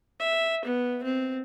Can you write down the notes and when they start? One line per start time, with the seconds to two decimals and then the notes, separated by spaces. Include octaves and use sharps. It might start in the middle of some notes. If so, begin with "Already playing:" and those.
0.20 E5
0.65 B3
1.03 C4